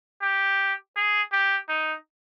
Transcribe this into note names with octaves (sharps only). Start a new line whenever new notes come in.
G4
G#4
G4
D#4